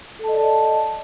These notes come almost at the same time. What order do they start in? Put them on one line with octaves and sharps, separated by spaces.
A4 A5 D#5 D5